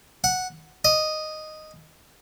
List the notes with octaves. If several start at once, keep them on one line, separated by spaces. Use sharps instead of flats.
F#5
D#5